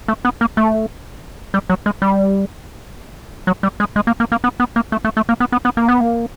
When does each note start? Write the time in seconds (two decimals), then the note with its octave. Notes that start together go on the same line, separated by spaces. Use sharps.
0.08 A3
0.25 B3
0.41 A#3
0.57 A3
1.54 G3
1.70 F#3
1.86 G#3
2.02 G3
3.47 F#3
3.63 G3
3.80 G#3
3.96 G#3
4.07 A#3
4.20 A#3
4.32 A#3
4.44 B3
4.60 B3
4.76 A#3
4.92 A3
5.05 A3
5.17 A3
5.29 A#3
5.40 B3
5.52 B3
5.65 B3
5.77 A#3
5.88 B3
6.00 A#3